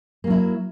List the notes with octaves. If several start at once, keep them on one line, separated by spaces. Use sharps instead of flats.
F#3 A#3 E4